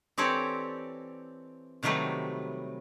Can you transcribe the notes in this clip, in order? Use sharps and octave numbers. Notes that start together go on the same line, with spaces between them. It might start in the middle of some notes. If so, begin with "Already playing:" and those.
E3 C4 G4 A4 C#5 D5
C3 D#3 F#3 G3 A3 B4